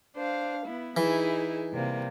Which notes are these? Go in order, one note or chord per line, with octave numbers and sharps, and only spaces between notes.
D4 C5 F5
B3 E4
E3 D#4 E4 G#4
C3 G3 A#3